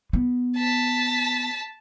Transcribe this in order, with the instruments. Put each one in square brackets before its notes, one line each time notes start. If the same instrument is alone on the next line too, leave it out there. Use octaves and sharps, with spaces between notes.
[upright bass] B3
[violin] A5 B6